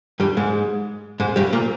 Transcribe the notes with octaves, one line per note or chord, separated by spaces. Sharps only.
G2 G3
G#2 G#3
G#2 G#3
G2 G3
A#2 A#3